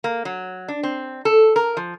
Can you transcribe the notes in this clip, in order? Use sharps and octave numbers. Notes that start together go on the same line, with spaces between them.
A#3
F#3
D4
C4
A4
A#4
F3